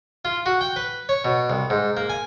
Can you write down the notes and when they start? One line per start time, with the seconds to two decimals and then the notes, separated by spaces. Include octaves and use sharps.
0.25 F4
0.46 F#4
0.61 G5
0.76 B4
1.09 C#5
1.25 B2
1.50 C2
1.70 G#2
1.97 A#3
2.09 G#5